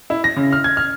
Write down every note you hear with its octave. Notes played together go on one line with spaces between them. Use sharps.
E4
A#6
C#3
F6
G#6
F6